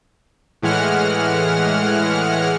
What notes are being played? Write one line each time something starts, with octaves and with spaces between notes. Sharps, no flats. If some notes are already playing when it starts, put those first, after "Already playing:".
A2 E3 G#3 F#5 F6